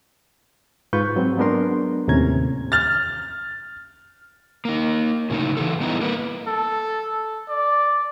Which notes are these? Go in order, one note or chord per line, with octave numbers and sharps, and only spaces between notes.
G#2 F4 B4 C#6 G6
F#3 C4
F#3 G#3 B3 D4 A#4 C6
D#2 A2 C3 C#4 A#5 G#6
F6 A6
A#3 D#4
A2 C#3 F#3 D#4
E3 G#4 A4
G3 B3 D#4 E4
A#3 B4
A4
D5